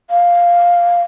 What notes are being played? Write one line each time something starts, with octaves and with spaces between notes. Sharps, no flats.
F5